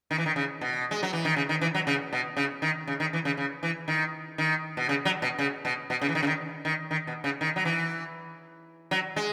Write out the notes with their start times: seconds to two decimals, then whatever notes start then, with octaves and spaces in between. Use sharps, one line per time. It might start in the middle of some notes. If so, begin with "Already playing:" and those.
0.11 D#3
0.18 E3
0.26 D#3
0.36 C#3
0.61 B2
0.91 G#3
1.03 F#3
1.13 E3
1.25 D#3
1.36 C#3
1.49 D#3
1.61 E3
1.74 F#3
1.87 C#3
2.13 B2
2.37 C#3
2.62 D#3
2.87 C#3
3.00 D#3
3.13 E3
3.25 C#3
3.37 C#3
3.63 E3
3.88 D#3
4.38 D#3
4.77 B2
4.89 C#3
5.05 F#3
5.22 B2
5.39 C#3
5.65 B2
5.90 B2
6.01 C#3
6.09 E3
6.15 D#3
6.23 C#3
6.27 D#3
6.65 D#3
6.91 D#3
7.07 B2
7.24 C#3
7.41 D#3
7.56 F#3
7.65 E3
8.91 F#3
9.16 G#3